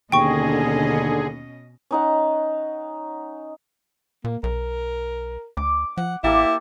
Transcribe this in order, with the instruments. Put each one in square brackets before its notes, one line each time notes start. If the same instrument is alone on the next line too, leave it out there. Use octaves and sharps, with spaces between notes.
[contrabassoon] D#2 [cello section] B2 C#4 D#5 [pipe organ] D3 G#4 [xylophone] G5 C#6
[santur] C#4 D#4 F#5
[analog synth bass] A#2 [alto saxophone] A#3
[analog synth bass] B1 [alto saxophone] A#4
[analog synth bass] D2 [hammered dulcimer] D6
[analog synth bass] F3 [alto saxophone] F#5
[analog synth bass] A1 [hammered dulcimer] A#3 G4 A4 [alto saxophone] E4